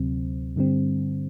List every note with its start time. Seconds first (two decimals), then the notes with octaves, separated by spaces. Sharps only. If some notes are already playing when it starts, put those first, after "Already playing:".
Already playing: D2 C3 F#3 C4
0.56 G2 D3 G3 C4